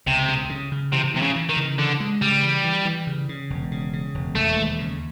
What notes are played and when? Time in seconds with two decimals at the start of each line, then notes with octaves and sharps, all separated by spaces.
0.07 C#2 C3
0.28 C#3
0.50 C#3
0.72 C#3
0.92 C3 E3
1.14 C3 E3
1.22 C#3
1.36 E3
1.49 D#3
1.57 C#3
1.78 D3 E3
2.00 G#3
2.22 C#3 G3
2.42 E3
2.64 E3
2.85 E3
3.07 C#3
3.29 C#3
3.50 E1
3.71 C#3
3.93 C#3
4.15 E1
4.35 E1 A3
4.56 D#2
4.78 C#3